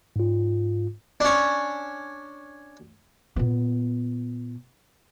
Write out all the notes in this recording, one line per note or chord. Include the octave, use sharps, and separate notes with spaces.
G#2 F4
C#4 D4
A#2 B3